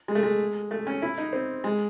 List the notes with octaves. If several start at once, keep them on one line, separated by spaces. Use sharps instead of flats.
G#3
A3
G#3
A3
C#4
E4
D#4
C4
G#3